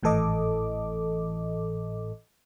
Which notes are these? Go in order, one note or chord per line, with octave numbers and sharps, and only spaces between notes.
G#1 A2 E3 A4 D#5 D6